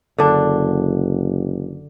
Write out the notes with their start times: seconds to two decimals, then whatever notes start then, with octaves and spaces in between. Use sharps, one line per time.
0.18 F#1 D3 D4